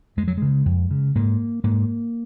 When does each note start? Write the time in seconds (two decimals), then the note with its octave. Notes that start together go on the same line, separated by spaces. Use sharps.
0.17 F2 G#3
0.28 F#3
0.37 C#3 G#3
0.66 F2
0.91 C#3
1.15 G#2 A#3
1.64 G#2 A#3